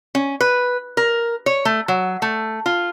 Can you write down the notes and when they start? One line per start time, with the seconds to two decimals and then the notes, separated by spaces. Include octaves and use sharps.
0.15 C#4
0.41 B4
0.97 A#4
1.46 C#5
1.65 A3
1.88 F#3
2.22 A3
2.66 F4